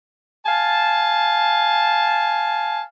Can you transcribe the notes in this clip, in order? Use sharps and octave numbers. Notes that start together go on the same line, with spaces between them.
F5 G#5 A5